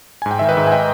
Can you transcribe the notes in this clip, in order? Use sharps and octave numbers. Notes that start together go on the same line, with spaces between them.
G#2 G#5
G5
D#3 E5
B4 D#5
G#2
G#5
D#5 G5